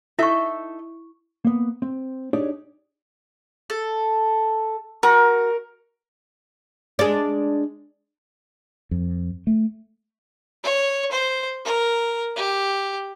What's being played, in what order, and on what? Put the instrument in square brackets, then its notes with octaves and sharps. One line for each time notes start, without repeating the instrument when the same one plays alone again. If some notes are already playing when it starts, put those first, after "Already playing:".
[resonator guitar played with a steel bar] D#4 A4 E5 [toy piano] E4 C#6
[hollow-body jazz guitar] A#3 B3
C4
D4 D#4 G4 G#4 C#5 D5
[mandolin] A4
[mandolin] F#4 [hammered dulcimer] A#4
[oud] G#3 D4
[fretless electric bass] F2
A3
[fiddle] C#5
C5
A#4
G4